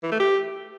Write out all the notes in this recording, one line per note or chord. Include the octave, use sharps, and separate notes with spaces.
E3
A3
G4